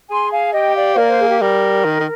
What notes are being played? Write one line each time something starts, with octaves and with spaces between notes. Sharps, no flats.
G#4 G#5 C6
F5 G#5
G4 D#5 G5
D5 F5
C5
A#3 A#4 D5
C5
G#4
G4
G3 A#4
D#3
D#3